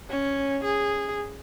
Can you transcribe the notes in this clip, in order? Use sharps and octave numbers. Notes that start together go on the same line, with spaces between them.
C#4
G#4